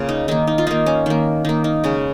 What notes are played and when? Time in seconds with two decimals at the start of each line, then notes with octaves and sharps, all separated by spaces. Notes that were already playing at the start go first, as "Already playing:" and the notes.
Already playing: C#3 A#3 F4
0.09 D#4
0.28 D#3 A#3 D#4
0.47 D#4
0.58 F4
0.67 D#3 A#3 D#4
0.86 C#4
1.06 D#3 A#3
1.45 D#3 A#3 D#4
1.64 D#4
1.84 C#3 G#3 C#4